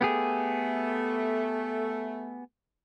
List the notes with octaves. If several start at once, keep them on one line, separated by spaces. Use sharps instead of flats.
A3 B3 G4 G#4